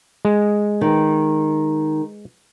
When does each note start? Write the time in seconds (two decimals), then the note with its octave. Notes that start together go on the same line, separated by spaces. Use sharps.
0.25 G#3
0.81 D#3